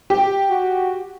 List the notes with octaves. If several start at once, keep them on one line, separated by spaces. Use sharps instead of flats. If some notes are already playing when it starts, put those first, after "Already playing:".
G4
F#4